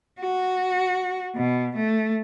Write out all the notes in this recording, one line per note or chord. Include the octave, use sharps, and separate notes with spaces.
F#4
B2
A3